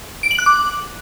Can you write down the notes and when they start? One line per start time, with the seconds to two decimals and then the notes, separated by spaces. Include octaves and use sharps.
0.23 D7
0.31 F#7
0.39 F#6
0.46 D6